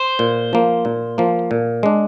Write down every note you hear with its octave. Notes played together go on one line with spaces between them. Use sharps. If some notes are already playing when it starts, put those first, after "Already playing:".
Already playing: C5
A#2
F3 A#3
A#2
F3 A#3
A#2
G#3 D4